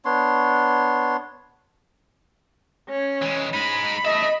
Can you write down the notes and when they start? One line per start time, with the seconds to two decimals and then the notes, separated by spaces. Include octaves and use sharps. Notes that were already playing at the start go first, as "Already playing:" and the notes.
0.05 B3 D4 C#5 C6
2.89 C#4
3.22 E3 G#3
3.54 G#3 D#4 B5
4.05 A4 D#5 E5